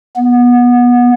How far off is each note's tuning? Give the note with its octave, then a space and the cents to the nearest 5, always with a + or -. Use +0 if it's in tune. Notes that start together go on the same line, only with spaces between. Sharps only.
B3 -20